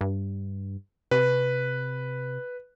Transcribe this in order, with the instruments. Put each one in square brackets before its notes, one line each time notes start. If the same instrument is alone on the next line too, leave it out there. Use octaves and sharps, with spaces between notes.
[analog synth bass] G2
[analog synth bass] C3 [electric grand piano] B4